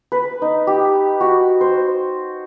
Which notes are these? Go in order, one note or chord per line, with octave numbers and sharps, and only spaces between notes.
B4
D#4
G4
F#4
C5